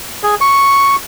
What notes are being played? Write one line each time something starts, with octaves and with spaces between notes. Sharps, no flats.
G#4
C#6